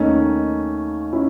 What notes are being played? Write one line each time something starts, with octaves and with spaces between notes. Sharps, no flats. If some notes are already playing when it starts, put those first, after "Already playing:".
Already playing: D#2 D#3 A3 C#4
C#4 E4